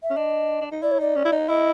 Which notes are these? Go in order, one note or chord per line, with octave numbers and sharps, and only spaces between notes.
E5
C#4
D4 D#5
D4
D#4
E4 D5
C#5
D#4 D5
C#4
E4
D#4
E4 D#5